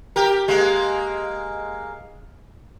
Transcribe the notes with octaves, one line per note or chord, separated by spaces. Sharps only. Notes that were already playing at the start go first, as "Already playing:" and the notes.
G4 A#4
G#3 A#3